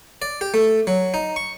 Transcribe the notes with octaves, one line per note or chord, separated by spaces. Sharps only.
D5
G4
A3
F#3
D#4
C#6